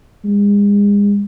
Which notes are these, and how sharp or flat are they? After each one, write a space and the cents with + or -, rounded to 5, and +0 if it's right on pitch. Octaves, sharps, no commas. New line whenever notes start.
G#3 -35